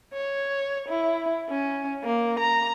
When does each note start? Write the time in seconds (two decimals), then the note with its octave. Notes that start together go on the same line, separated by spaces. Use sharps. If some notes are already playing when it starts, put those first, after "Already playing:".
0.13 C#5
0.89 E4
1.50 C#4
2.04 A#3
2.39 A#5